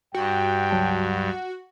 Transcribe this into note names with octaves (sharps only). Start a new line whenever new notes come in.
G2 F#4 G5
C#2 F#3 A5